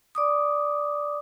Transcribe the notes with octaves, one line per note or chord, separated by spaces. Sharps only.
D5 D6 D#6